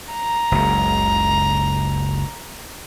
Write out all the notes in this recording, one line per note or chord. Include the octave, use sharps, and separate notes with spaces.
A#5
F#1 C#2